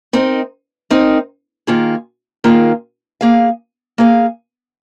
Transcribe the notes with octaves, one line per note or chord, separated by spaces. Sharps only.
C4 D#4 A#4 D#5
C4 D#4 A#4 D#5
D#3 A#3 F4 G#4
D#3 A#3 F4 G#4
A#3 G#4 F5
A#3 G#4 F5